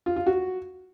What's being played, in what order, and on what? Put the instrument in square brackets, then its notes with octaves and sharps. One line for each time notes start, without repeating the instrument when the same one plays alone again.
[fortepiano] F4
F4
F#4